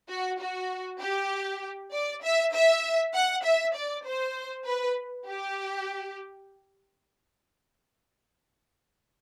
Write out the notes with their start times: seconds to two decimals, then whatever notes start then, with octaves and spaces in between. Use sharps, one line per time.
0.09 F#4
0.39 F#4
1.01 G4
1.92 D5
2.23 E5
2.53 E5
3.14 F#5
3.44 E5
3.75 D5
4.05 C5
4.66 B4
5.27 G4